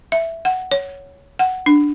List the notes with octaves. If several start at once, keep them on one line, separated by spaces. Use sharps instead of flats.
E5
F#5
C#5
F#5
D4